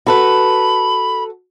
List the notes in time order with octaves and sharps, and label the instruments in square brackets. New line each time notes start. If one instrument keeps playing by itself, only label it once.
[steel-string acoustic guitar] F#4 A4 B4 [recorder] B5